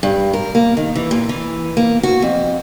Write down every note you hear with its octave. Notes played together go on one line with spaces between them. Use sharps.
G2
A#4
A#3
D#3
E3
A#2
E3
A#3
F#4
F2